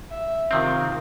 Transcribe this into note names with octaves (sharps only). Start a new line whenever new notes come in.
E5
C3 D#3 C4 F4 A#4